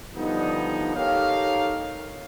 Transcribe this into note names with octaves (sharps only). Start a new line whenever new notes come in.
D3 F3 G3 B3 D#4
D#4 G4 A4 A#4 C#5 F5